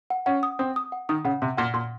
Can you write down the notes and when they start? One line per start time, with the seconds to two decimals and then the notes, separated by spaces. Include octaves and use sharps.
0.10 F#5
0.26 C#4 F#5
0.43 D#6
0.59 C4 D#6
0.76 D#6
0.92 F#5
1.09 D#3 D#6
1.25 C#3 F#5
1.42 C3 C6
1.57 A#2 F#5
1.74 A#2 C6